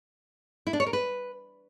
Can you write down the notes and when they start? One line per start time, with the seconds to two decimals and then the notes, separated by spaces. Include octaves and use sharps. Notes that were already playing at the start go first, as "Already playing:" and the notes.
0.67 E4
0.73 D4
0.80 C#5
0.86 A#4
0.93 B4